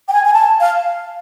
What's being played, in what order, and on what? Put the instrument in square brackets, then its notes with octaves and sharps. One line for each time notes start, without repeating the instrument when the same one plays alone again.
[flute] G5
G#5
G#5
A5
F5